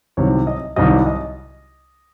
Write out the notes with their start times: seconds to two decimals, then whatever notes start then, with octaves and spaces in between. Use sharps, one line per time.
0.17 C2 C3 D#3 F#3 C#5
0.47 D#5
0.76 C2 C3 D#3 F#3 D#5
1.06 D#5